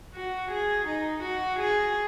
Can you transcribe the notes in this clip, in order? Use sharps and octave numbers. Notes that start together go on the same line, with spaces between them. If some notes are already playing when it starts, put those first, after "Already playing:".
F#4
G#4
D#4
F#4
G#4